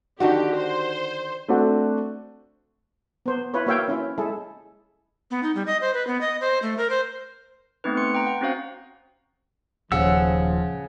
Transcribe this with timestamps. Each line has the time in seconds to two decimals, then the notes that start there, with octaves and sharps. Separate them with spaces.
0.20 D3 D#3 F#4 G4
0.55 C5
1.48 A3 C4 D4 F#4
3.26 B3 C5
3.54 E4 F4 B4 C#5
3.66 A#3 F#4 C#5 E5 F5 G5
3.88 C#4 E4 F4
4.18 G#3 E4 G#4 A4
5.31 B3
5.43 D#4
5.55 G3
5.67 D#5
5.81 C5
5.94 B4
6.07 B3
6.21 D#5
6.41 C5
6.62 A3
6.78 A#4
6.90 C5
7.84 A3 B3 C4 D#4 B4
7.97 B4 C6 C#7
8.14 G5 A#5
8.27 F#5
8.41 C4 C#4 F#4 C5 F5
9.92 D#1 C#3 F3 F#5 E6